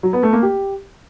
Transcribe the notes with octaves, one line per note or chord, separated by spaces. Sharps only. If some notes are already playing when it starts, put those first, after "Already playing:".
F#3
B3
A3
A#3
G4